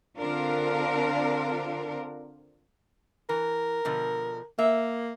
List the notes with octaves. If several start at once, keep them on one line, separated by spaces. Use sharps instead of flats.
D3 C4 D4 F4 A#4
E3 A#4
B2 D3 F3
A#3 E5